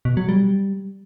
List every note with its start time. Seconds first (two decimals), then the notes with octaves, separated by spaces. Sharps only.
0.05 B2
0.17 F#3
0.29 G3